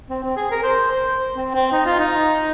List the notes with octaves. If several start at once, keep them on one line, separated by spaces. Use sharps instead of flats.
C4
C4
G#4
A#4
C5
C5
C4
C4
D#4
F4
D#4